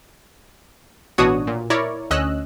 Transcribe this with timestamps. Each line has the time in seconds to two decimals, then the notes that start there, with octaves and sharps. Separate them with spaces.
1.18 A1 B2 D4 F#4 C#5 D#6
1.47 A#2
1.70 E4 A#4 C#5 D5
2.11 D2 C#4 D#5 E6 F#6